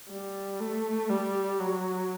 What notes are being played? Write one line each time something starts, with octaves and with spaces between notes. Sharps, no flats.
G3
A3
G3
F#3